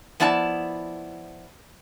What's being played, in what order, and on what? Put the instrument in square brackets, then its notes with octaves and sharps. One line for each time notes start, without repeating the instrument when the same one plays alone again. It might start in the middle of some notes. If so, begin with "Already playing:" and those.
[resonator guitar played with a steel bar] F3 B3 E4 D5 A5